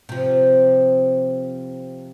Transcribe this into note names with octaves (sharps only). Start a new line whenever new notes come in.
C3 F3